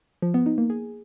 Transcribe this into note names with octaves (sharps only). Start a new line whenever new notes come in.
F3
B3
D#4
A#3
G#4